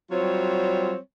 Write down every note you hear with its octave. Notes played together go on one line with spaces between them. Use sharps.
F#3 G3 C4 F4 C#5